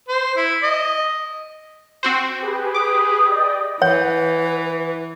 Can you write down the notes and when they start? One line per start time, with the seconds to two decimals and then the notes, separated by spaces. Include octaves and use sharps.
0.08 C5
0.37 E4
0.63 D#5
2.03 C4 F#4 C5 G5
2.39 G4 G#4 B4
2.74 D6 D#6
3.27 D5 D#5 G5
3.82 E3 B4 C#5 F#5